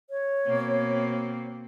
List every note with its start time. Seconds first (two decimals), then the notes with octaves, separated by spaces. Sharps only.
0.10 C#5
0.46 B2 A#3 C4